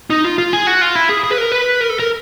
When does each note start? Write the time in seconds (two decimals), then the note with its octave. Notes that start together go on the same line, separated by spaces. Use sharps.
0.10 D#4
0.24 F4
0.38 F4
0.53 G#4
0.67 F#4
0.81 F4
0.95 E4
1.09 G#4
1.24 G#4
1.32 B4
1.38 A#4
1.52 B4
1.81 A#4
1.90 A4
1.99 A#4